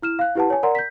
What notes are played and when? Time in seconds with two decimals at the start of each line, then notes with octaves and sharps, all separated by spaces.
0.02 E4 F6 E7
0.19 F5 F#6
0.35 E4 G4 B4 F#5 A5
0.50 C#5 G#5
0.63 A#4 D5 F#5 A#5 C6
0.75 G6 B6